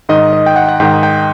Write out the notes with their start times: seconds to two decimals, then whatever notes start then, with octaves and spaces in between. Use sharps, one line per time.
0.09 G#2 D#3 D#5
0.33 D#5
0.46 G5
0.56 F#5
0.68 F#5
0.80 G#2 D#3 G5
1.03 G5